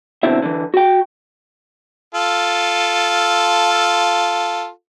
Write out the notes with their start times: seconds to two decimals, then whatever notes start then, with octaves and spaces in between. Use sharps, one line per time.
0.23 B2 D3 C4 E4 E5
0.42 D3 E3
0.74 F#4 G5
2.15 F4 A4